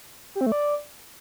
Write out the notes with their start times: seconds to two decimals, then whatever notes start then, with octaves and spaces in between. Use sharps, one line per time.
0.35 G4
0.41 C4
0.46 A3
0.52 D5